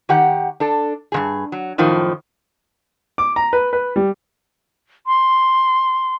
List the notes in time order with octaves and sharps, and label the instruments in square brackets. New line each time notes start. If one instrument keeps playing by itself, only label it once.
[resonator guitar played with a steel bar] D#3 G4 F#5
D4 A4
G2 C3 G#4
F#3
F#2 A2 D#3 F3
[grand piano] D6
A#5
B4
B4
G3
[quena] C6